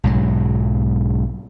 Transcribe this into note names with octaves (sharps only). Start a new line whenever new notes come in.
B1 G#2 F#3